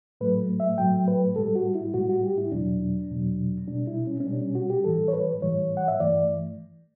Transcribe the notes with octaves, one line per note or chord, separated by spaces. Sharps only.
A2 F#3 A3 B4
E5
A2 F#3 A3 G5
B4
A2 G3 A4
F#4
E4
A2 G3 F#4
F#4
G4
E4
E2 B2 F#3 D4
E2 B2 F#3
B2 G3 D4
E4
C#4
C#4
B2 G3 D4
C#4
F#4
G4
A2 E3 G3 A4
C#5
B4
A2 E3 G3 C#5
F#5
E5
G2 E3 A3 D5